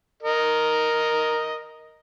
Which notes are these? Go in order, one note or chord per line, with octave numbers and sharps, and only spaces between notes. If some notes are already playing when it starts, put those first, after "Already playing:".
A#4 D#5